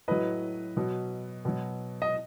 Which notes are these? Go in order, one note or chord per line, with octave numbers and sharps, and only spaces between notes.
A2 F#3 B4 D#5
B2 F#3
B2 F#3
D#5